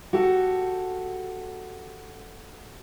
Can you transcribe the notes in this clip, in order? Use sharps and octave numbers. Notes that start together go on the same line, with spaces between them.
F#4 G4 A4